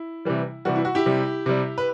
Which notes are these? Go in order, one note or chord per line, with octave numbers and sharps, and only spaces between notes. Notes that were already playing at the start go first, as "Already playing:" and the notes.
Already playing: E4
C3 E3 G3
C3 E3 G3 F#4
E4
F#4
E4 G4
C3 G3
C3 G3
B4